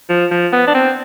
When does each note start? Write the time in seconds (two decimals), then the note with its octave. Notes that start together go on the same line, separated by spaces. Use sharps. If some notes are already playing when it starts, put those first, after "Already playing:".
0.09 F3
0.31 F3
0.53 B3
0.67 D4
0.74 C4